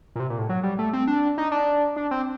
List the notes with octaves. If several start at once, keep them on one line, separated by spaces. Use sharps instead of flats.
A#2
C3
A#2
A2
F#3
G3
A3
C4
D4
D#4
D4
D4
C4